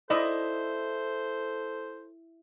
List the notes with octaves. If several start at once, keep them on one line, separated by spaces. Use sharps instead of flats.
E4 A4 C5 D5 D#5